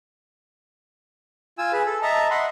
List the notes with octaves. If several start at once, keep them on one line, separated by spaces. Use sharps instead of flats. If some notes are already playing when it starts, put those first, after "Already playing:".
F4 G#5 E6
G#4 B4
A4
D#5 E5 A5 A#5
D#5 E5 F#5 B5 C6